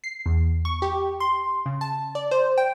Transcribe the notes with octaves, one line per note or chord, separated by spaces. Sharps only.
C7
E2
C#6
G4
C6
C#3
A5
D5
C5
G5